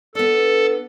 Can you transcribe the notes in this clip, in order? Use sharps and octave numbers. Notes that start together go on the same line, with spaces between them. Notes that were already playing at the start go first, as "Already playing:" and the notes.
B3 D4 A4